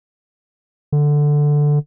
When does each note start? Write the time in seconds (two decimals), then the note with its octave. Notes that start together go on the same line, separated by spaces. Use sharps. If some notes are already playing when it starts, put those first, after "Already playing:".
0.92 D3